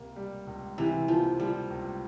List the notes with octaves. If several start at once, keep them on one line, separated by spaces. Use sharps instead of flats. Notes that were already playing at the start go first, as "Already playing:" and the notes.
Already playing: C#2 C3 A#3
G3
C#2
C3 E3
F3 A#3
F3 G3
C#2